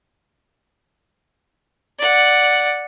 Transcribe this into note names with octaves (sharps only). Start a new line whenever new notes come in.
D5 F#5